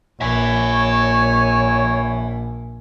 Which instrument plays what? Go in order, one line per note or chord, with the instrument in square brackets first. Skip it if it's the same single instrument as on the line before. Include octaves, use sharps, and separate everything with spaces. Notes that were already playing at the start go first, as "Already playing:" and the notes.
[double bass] A#1 [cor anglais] C#5 [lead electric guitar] E5 G#5